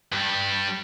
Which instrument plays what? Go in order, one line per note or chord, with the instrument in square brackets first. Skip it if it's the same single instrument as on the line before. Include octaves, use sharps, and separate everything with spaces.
[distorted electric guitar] G2 G3